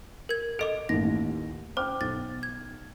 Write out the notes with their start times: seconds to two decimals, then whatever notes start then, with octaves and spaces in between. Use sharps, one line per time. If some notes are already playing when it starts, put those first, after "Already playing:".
0.29 A#4 G#6
0.59 A4 D#5 D6 D7
0.89 A1 D#2 A#6
1.77 C5 G5 D6 F6
2.01 B1 A6
2.43 G#6